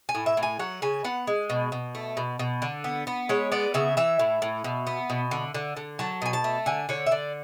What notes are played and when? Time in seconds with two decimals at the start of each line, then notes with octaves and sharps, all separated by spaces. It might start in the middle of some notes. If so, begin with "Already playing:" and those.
0.09 G#5
0.15 A2
0.26 E5
0.37 A2
0.43 G#5
0.59 F#3 F#5
0.82 C#3 G#5
1.04 B3 F#5
1.27 G#3
1.50 B2
1.72 B2
1.95 A3
2.17 B2
2.39 B2
2.62 D3
2.84 B3
3.07 B3
3.29 G#3 C#5
3.52 B3 D5
3.74 C#3 E5
3.97 E3 E5
4.19 A2
4.42 A2
4.64 B2
4.87 B3
5.10 B2
5.31 D3
5.55 D3
5.77 D3
5.99 F#3 A5
6.22 B2 G#5
6.33 A5
6.44 A3
6.66 D3 G#5
6.89 D3 C#5
7.06 E5
7.11 D3 D5